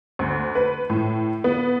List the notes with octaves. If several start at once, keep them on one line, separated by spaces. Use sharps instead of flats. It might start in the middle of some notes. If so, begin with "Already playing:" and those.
D2
B4
A2
B3